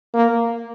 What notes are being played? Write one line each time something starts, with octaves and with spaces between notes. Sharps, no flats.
A#3